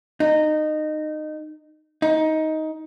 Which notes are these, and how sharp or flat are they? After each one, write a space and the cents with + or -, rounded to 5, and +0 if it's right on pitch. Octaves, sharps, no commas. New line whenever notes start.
D#4 -20
D#4 +15